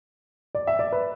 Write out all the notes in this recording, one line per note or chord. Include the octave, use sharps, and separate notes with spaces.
D5
E5
D5
B4